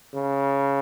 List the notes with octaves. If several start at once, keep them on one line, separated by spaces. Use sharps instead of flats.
C#3